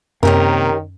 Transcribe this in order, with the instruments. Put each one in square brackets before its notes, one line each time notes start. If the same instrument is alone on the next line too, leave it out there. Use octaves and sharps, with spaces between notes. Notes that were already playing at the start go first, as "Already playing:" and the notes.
[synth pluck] F#2 [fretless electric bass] C3 A#3 [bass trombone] D#3 [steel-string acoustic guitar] C#4 G4 A#4